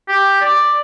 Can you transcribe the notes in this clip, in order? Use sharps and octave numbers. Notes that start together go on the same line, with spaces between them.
G4
D5